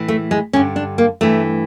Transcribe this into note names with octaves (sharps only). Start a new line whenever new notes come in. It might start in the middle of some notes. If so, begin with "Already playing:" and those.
Already playing: A2 E3
A3
G#3
G2 D3 C#4
D4
A#3
G2 E3 A3